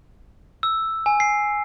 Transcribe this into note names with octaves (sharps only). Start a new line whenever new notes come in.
E6
G#5
C7